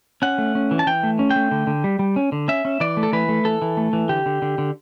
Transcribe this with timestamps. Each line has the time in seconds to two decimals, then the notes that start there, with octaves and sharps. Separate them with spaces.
0.22 C#4 F#5
0.38 A3
0.55 C#4
0.71 E3
0.79 A5
0.86 E3 G5
1.03 A3
1.19 C#4
1.31 G5
1.36 A3
1.51 D3
1.67 D3
1.84 G3
1.99 G3
2.16 C#4
2.32 D3
2.48 C#4 E5
2.65 C#4
2.80 E3 D5
2.97 A3
3.03 A4
3.13 E3 B4
3.29 A3
3.45 E3 A4
3.62 E3
3.77 A3
3.93 E3
4.09 D3 G4
4.26 D3
4.42 D3
4.58 D3